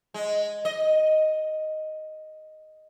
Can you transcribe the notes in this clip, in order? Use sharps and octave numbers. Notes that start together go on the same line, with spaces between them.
G#3
D#5